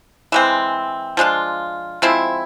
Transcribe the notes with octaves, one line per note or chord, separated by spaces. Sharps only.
E3 G#3 C4
F3 G#3 D4 F4
F3 G#3 C4 E4